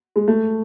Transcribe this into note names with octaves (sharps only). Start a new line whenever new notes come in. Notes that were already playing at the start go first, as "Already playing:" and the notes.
G#3
A3